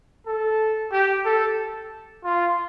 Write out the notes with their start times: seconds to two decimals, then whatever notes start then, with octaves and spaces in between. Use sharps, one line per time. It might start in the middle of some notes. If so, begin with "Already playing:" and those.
0.27 A4
0.92 G4
1.25 A4
2.25 F4